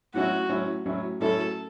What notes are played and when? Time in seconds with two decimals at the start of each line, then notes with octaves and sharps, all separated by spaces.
0.14 A2 F#3 C#4 E4 F#4
0.49 A2 F#3 C#4 E4
0.86 A2 F#3 C#4 E4
1.20 A2 F#3 C#4 E4 A4